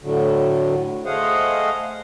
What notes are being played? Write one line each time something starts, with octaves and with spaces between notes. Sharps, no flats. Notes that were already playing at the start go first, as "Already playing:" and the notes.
A2 D3 F#3
A3 G#4 C5 D#5 F5 F#5